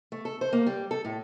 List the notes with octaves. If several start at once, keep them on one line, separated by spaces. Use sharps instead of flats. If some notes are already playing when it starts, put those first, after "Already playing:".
A3
A4
C5
A#3
G3
A4
A2